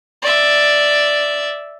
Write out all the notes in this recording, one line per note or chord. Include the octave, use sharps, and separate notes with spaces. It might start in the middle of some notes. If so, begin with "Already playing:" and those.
D5 E5